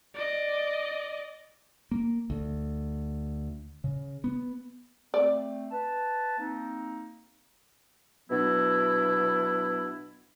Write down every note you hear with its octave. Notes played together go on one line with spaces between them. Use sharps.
D5 D#5
A#3
D2
C#3
B3
A3 C4 D5
B4 A5
A#3 C4 D#4
B2 F#3 B3 D4 E4